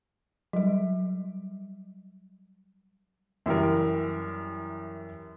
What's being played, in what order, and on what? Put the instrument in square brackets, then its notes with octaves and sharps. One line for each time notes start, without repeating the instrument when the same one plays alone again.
[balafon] F#3 G3
[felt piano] F#2 E3 G3 A#4